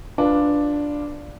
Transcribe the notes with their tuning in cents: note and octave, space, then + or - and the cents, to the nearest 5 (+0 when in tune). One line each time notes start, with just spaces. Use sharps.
D4 +0 F4 +0 B4 +0